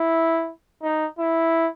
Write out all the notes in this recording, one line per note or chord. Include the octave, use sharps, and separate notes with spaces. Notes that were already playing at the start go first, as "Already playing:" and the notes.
Already playing: E4
D#4
E4